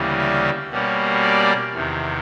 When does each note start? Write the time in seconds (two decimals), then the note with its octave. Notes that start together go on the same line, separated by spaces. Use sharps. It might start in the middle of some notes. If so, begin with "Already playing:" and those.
Already playing: D2 C#3 E3 G3 A#3
0.19 E5
0.70 B2 G3 A#3 C#4
1.22 D5
1.73 E2 C3 D#3